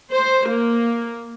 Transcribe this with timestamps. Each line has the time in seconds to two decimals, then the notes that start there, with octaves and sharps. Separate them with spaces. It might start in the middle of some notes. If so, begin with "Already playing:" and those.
0.11 C5
0.47 A#3